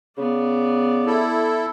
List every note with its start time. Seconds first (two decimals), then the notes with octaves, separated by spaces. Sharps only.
0.18 C#3 B3 D5
1.06 E4 A4